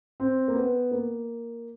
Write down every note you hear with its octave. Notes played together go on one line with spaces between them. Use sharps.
C4
A#3
B3
A#3